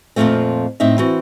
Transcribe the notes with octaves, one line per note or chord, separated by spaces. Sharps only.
F2 A#2 C#3 F3 A3 C4
A2 C4 D#4 E5
E3 C4 F#4